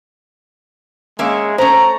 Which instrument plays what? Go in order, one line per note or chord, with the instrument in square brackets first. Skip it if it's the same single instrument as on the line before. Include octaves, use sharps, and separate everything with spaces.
[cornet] G#3 [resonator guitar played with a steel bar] A#3 C#4 E5
[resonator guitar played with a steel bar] A3 C#4 [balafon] C5 [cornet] A#5